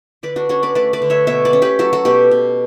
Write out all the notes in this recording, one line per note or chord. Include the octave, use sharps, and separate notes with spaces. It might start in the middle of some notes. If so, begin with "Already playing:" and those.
D3 B4 D5
D4 F#4
C#4 D4 F#4
B4 D5
A3 B4 D5
B4 D5
D3
C#5 E5
B2 C#5 E5
B4 D5
C#4
G4 B4
F#3 F#4 A4
F#4 A4
B2 G4 B4
B2